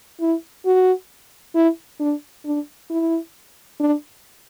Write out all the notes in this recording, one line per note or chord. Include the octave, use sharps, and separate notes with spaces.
E4
F#4
E4
D4
D4
E4
D4